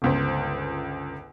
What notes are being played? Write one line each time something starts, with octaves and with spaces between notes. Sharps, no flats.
G1 C#2 C5